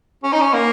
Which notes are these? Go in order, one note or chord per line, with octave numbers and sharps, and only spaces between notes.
C#4
D#4
C#4
A#3